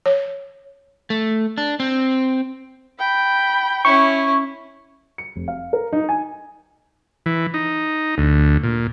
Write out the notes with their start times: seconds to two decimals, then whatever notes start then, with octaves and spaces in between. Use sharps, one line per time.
0.06 C#5
1.10 A3
1.58 D4
1.80 C4
2.99 G5 B5
3.85 C#4 E4 C#6
5.18 C#7
5.36 F1
5.48 F5
5.73 A#4
5.93 D#4
6.09 G#5
7.26 E3
7.54 D#4
8.18 D2
8.63 A#2